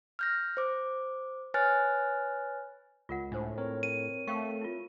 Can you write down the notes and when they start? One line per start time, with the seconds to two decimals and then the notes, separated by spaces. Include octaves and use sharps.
0.19 F6 G6 A#6
0.57 C5 D6
1.54 B4 C#5 G#5 F6 F#6 A6
3.09 C#2 F4 A#4 F#5
3.32 A2 D4 C5
3.58 C4 A#4 C#5
3.83 D#7
4.27 A3 F5 G5 C#6
4.61 E4 F4